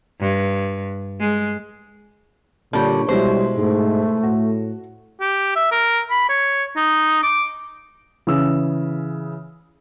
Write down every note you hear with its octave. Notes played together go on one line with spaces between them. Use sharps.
G2
G#3
A#2 D3 G3 C#5
B2 G3 G#3 E4 C5
G#2 A3
A2 F#4
G4
E5
A#4
B5
C#5
D#4
D6
C#3 E3 D#6 E6